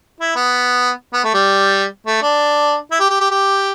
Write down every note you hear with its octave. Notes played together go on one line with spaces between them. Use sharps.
E4
B3
B3
A3
G3
A3
D4
E4
G4
G4
G4
G4